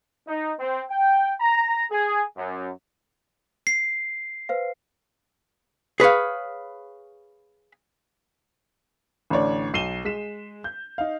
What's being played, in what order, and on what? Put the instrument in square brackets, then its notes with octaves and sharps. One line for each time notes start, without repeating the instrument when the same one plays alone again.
[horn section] D#4
C4
G5
A#5
G#4
F#2
[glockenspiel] C7
[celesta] B4 C5 F5
[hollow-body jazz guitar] G#4 B4 C#5 F5
[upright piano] A1 D3 C#5 D5
B1 C7 D#7 E7 G7
G#3 B6 E7
G6
D#4 F5